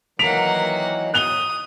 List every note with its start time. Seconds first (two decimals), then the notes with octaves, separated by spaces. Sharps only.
0.19 D#3 E3 F#3 A#3 F#5 B6 D7 F7
1.14 D#6 F#6 F7 G7